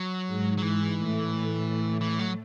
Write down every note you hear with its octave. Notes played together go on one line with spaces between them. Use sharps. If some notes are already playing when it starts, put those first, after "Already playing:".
Already playing: F#3
G#2 G#3
F#3
G#2 E3 G#3
A2 A3
E3
F#3